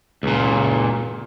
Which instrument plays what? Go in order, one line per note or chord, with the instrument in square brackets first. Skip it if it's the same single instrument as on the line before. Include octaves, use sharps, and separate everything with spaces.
[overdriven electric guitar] C#2 A#2